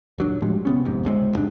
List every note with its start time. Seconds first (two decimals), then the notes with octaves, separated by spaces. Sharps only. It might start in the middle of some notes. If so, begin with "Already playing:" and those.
0.18 D#1 F#3 D4
0.42 A2 F3 G3 G#3
0.65 C3 B3 C#4
0.85 A1 F2 G#2 C3
1.03 D1 C#2 C3 G#3
1.35 F2 G#2 D4